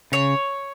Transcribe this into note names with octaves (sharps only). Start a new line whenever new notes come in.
C#3 C#5